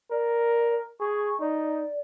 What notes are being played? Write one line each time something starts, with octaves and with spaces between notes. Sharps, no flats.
A#4 D5
G#4 C#6
D#4 D5